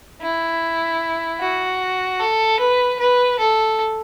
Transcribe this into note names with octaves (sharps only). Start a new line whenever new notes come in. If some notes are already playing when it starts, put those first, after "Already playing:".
E4
F#4
A4
B4
B4
A4